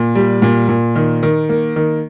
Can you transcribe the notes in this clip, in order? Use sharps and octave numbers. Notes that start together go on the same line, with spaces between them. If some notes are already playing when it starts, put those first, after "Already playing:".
Already playing: A#2
G3
A#2
A#2
D#3
D#3
A#3
D#3